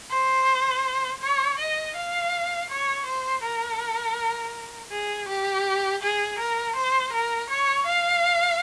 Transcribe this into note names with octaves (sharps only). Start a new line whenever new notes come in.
C5
C#5
D#5
F5
C#5
C5
A#4
G#4
G4
G#4
A#4
C5
A#4
C#5
F5